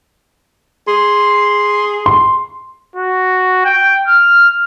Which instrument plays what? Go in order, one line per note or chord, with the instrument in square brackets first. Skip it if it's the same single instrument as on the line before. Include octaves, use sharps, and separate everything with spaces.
[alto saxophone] G#4 [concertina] C6
[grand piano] C6
[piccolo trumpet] F#4
G5
F6